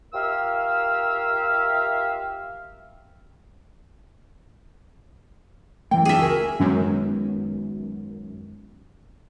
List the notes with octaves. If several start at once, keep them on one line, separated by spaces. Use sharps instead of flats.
F4 G4 A#4 E5 F5 E6
F#2 E3 A3 G5
D4 F4 G#4 E5 A5
C#2 F#4 A#4 G#5
F#2 D#3 G#3 B3